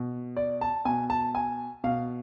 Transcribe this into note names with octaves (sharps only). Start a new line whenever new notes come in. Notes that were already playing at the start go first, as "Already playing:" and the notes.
Already playing: B2
D5
A5
B2 G#5
A5
G#5
B2 F5